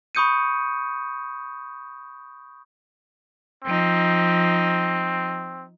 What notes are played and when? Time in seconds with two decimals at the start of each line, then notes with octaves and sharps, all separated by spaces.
0.15 B5 C#6 D#6 G6 C#7 D#7
3.64 F3 C4 D#4